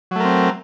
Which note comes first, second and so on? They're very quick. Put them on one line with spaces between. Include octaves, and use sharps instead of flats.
F#3 A3 A#4 C4